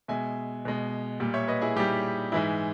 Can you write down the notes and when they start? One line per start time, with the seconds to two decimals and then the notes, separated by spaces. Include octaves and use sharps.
0.08 B2 G#3 E5 G#5
0.65 B2 G#3
1.20 A#2 G3
1.34 C#5 E5
1.48 B4 D#5
1.61 E4 G#4
1.76 A#2 G3 D#4 G4
2.32 G#2 E3 G#3 E4